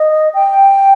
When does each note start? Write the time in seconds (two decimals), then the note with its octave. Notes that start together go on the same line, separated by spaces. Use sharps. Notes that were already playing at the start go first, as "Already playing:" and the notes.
Already playing: D#5
0.34 G5